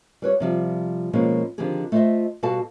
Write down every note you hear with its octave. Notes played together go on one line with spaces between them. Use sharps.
G3 B4 C#5
C3 F3 G3
B2 F3 G#3 A#3 C#4
D3 D#3 F3 C4 G4 G#4
A3 F4 C5 C#5 D#5 E5
B2 G3 F#4 A4 F5 A5